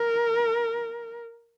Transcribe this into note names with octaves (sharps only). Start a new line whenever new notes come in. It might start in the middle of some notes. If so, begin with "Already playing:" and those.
Already playing: A#4